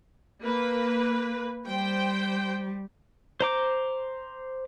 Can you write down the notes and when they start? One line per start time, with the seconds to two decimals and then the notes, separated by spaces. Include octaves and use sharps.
0.43 A#3 B4
1.68 G3 C5 G5
3.40 C5 A#5 D6